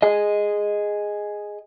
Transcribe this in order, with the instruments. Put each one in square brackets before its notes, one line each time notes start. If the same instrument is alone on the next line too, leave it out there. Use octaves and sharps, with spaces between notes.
[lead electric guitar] G#4 D#5